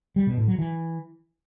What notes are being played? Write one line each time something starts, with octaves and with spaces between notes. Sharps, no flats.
G3
B2
A2
F#3
E3